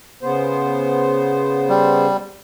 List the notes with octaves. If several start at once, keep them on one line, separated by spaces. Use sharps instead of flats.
C#3 B3 C5
G3